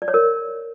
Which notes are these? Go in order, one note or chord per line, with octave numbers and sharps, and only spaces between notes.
D5
C#5
A#4